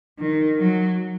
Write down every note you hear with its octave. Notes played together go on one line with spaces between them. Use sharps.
D#3
F#3